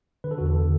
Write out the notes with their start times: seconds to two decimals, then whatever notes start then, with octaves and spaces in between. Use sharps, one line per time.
0.24 D3 B4
0.31 A4
0.38 E2 F#4
0.46 A4
0.56 D3